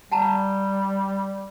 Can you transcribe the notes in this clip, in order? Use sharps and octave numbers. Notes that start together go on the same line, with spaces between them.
G3 F#5 A5 A#5